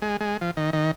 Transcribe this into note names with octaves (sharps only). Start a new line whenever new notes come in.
G#3
G#3
F3
D#3
D#3